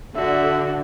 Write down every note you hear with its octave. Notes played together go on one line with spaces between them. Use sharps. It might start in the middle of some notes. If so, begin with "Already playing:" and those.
D3 F#4 E5